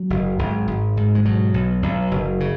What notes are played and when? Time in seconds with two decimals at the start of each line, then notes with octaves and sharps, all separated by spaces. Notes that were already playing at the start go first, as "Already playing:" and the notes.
Already playing: F#3
0.10 F#1
0.39 G#1
0.67 G#1
0.97 G#2
1.15 G#3
1.25 B2 F#3
1.54 B1
1.82 B1
2.11 F#1
2.40 C#3